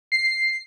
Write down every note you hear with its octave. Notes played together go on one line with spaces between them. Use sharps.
C7